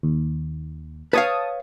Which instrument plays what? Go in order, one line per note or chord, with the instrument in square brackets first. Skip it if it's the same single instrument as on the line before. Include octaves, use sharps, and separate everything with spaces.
[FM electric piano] D#2
[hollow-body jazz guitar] B4 C#5 F5 [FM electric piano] A5 D#6